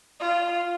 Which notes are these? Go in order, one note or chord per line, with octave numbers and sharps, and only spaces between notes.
F4